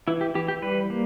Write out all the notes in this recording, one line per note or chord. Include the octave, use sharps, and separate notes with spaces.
E3 E4
G4
E3 G4
G4
G3 B4
A#3